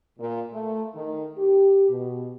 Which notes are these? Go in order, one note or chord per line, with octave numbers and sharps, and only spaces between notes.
A#2
A3
D#3
G4
B2